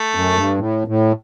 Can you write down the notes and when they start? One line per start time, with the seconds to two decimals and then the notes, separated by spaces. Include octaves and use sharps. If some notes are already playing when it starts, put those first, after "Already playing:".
Already playing: A3
0.15 F#2
0.37 G2
0.59 A2
0.87 A2